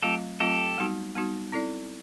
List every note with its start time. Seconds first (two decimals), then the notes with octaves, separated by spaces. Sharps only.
0.02 F#3 A3 C4 F4 G4 A4
0.40 F#3 A3 C4 F4 G4 A4
0.78 G3 B3 D#4 F#4
1.15 G3 B3 D#4 F#4
1.52 C4 E4 A4 D5